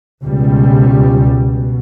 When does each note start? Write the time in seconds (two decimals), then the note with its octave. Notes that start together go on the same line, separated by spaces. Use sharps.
0.23 C#2 B2 G3
1.50 B2